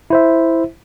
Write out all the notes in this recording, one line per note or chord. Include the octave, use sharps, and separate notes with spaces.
E4 C5 E5